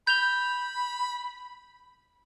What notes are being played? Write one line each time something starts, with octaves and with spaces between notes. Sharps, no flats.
B5 G6 F7 G7